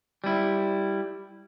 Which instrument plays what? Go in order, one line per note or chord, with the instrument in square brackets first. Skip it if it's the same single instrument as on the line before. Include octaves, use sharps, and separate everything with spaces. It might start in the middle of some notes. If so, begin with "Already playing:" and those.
[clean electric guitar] G3 E4